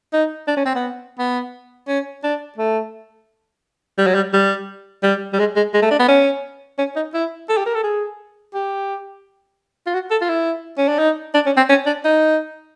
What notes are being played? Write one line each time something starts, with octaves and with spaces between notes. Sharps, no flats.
D#4
D4
C#4
C4
B3
B3
C#4
D4
A3
G3
F#3
G3
G3
G3
G3
G#3
G#3
G#3
A3
D4
B3
C#4
C#4
D#4
E4
A4
G4
A#4
A4
G#4
G4
F4
F#4
A4
F4
E4
C#4
D4
D#4
D4
C#4
C4
C#4
D4
D#4